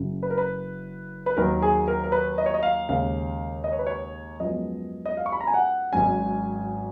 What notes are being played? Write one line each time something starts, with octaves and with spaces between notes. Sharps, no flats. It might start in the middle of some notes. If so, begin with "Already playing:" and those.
Already playing: F#1 F#2 C#3
B4
A#4
B4
B4
D#2 D#3 F#3 A#4
G#4
A#4
A#4
B4
D#5
C#5
D#5
F5
D#2 C#3 G#3 F5
D#5
C#5
B4
C#5
F#2 F3 G#3 B3 D#5
D#5
F5
C#6
B5
A#5
G#5
F#5
G#1 G#2 F#3 C#4 G#5